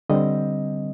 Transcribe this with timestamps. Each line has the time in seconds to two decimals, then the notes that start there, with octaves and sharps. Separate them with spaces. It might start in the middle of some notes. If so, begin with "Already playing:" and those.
0.09 D3 G3 C4 D#5